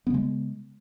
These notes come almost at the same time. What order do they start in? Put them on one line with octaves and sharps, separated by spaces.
B3 C#3 G#3